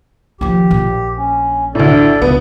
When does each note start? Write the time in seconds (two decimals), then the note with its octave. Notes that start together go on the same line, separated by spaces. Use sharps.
0.41 D#3 F3 G4
0.71 A#1
1.17 C#4
1.75 D2 A2 A4 D5
2.22 C#2 B3